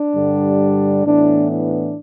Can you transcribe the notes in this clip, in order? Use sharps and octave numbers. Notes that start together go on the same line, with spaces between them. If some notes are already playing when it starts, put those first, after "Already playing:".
Already playing: D4
G2 D3 G3
A2 E3 B3 D4
D4